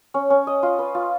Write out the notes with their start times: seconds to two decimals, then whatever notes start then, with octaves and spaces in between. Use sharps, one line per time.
0.14 C#4
0.30 C#4
0.47 D#5
0.63 F4
0.79 B4
0.95 F4